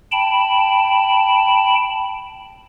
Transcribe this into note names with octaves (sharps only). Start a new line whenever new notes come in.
G5 A5 B5